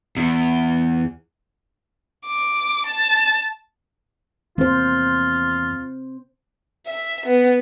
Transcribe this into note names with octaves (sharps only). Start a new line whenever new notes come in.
E2
D6
A5
E2 F3 A#3 C4 F4 C5
E5
B3